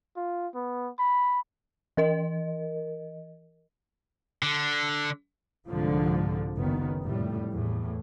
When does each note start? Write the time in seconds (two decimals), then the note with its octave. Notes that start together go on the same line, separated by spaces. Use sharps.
0.16 F4
0.55 B3
0.99 B5
1.97 E3 A#4 D#5
4.43 D3
5.68 C2 G#2 D3 F3
6.57 F#1 D#3 B3
7.03 F1 A2 G3
7.50 E2 A2